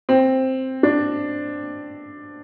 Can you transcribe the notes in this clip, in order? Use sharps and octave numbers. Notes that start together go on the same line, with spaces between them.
C4
D4